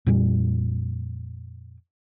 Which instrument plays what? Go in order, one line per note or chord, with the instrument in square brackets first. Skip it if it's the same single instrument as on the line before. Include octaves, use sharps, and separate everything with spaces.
[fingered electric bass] F2 A#2 G3